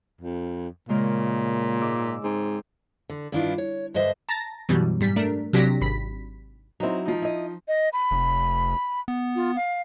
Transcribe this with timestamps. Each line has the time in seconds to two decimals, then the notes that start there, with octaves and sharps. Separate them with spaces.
0.21 F2
0.89 A#2 C#3 G#3 A#4
1.81 G#2 D6 E6
2.24 G#2 C4
3.10 D3
3.32 G2 D#3 B3 D4 E4 F4
3.58 C#5
3.94 G2 D3 C5 D#5 E5
4.29 A5 A#5 A6 A#6
4.69 F#2 B2 E3 F#3 G3
5.01 G#2 G3 B6
5.16 A3 D4 A#4
5.53 C3 F#3 D4 G4 A#6 B6
5.81 G#1 B5 B6
6.80 F#3 C4 D#4 E4
7.05 F3 D#4
7.22 E4 D#5
7.68 D#5
7.93 B5
8.11 F1
9.08 B3
9.36 F4
9.56 F5